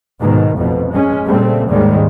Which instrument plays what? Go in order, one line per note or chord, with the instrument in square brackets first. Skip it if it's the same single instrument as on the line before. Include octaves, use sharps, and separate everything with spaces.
[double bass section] G#2 B2 D#3
A1 F2 B2
G#3 C#4
A#2 C#3 G3 A3 C4
D#2 G#2 D#3 G3 G#3